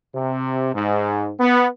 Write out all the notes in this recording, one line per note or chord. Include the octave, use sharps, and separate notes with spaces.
C3
G#2
B3